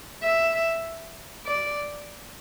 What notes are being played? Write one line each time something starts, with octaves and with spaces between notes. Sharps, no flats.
E5
D5